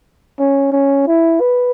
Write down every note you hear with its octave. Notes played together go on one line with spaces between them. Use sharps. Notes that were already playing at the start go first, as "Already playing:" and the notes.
C#4
C#4
E4
B4